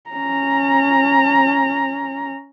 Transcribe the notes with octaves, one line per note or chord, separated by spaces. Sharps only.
C#4 A#5